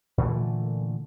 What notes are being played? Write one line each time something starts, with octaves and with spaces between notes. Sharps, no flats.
A#2 D3 E3 A3